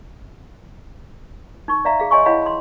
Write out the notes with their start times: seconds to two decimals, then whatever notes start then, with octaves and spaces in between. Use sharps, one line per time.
1.68 D#4 C#6
1.85 D5 E5 F5 A#5
2.00 G#4 F5
2.11 C#5 D#5 G#5 C6 C#6
2.26 E4 C#5 D#5 F5 F#5 B5
2.42 B5 C6